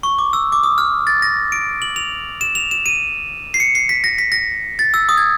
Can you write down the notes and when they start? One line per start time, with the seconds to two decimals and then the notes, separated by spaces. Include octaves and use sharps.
0.03 C#6
0.18 D6
0.33 E6
0.52 D6
0.63 D#6
0.78 F6
1.07 A6
1.22 A#6
1.52 D7
1.82 F#7
1.96 F7
2.41 E7
2.55 F7
2.71 E7
2.86 D#7
3.54 C7
3.60 C#7
3.75 C7
3.89 B6
4.04 A#6
4.18 B6
4.32 A#6
4.79 A6
4.94 E6
5.09 D#6
5.17 G#6